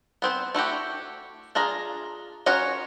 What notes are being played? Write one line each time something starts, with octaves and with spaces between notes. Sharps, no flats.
B3 C4 C5
A3 E4 F#4 G4
D4 F4 G#4 A#5
C#4 F4 F#4 A#4 C#5